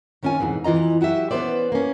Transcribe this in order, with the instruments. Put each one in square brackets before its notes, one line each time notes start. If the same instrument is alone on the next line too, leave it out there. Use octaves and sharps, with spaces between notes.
[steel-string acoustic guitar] D#3 C4 C#4 F4 G#5
F2 G#2 B2 E3
F2 E3 F4 D#5 A#5
F#3 F#4 G4 E5
B3 C#4 B4 C5 D5
A#3 C#4